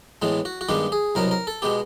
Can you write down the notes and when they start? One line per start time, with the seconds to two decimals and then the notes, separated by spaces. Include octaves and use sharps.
0.22 A2 E3 G#3 B3
0.45 F#4
0.61 F#4
0.69 G2 D#3 G#3 B3 G4
0.92 G#4
1.15 C2 B2 F#3 B3 A#4
1.31 A#4
1.47 A4
1.62 B2 G#3 B3 G4